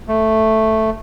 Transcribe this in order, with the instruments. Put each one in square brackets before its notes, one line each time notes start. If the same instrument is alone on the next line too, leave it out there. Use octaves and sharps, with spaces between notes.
[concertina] A3